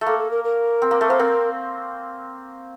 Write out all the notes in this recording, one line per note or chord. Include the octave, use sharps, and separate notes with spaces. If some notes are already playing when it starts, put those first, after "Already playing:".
A3
A#3 A4
A4
A#4
A#4
C4
A#3
A3
A#3 C5
C4 A#4